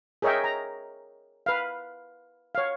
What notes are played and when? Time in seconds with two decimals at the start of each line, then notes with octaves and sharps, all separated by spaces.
0.22 G#4 A#4 C#5 D#5 E5 G5
0.44 A#5
1.46 B4 F5
2.55 C#5 F5